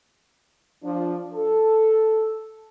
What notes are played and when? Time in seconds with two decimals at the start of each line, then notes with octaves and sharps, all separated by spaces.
0.84 F3 D4
1.34 A4